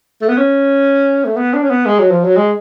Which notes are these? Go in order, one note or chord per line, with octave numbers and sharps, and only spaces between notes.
A3
B3
C#4
A3
B3
D4
C#4
B3
G#3
F#3
F3
F#3
G#3